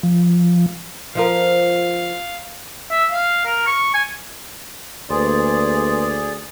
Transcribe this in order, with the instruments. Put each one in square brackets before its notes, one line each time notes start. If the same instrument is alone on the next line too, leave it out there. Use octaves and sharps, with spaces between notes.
[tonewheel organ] F3
[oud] F3 F4 A#4 [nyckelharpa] F5
[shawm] E5
F5
A#4
C#6
G#5
[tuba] D2 [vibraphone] A#3 B4 C6 [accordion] G#4 D5